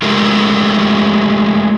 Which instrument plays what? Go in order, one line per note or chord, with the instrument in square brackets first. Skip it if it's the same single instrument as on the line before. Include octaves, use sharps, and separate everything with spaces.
[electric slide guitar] G#3 A3 F4 G4 G#4 A#4